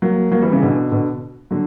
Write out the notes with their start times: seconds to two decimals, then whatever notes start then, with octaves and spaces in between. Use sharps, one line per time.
0.02 F#3 A#3
0.32 F#3 A#3
0.42 E3 G3
0.52 C#3 E3
0.62 B2 D3
0.91 B2 D3
1.51 D3 F#3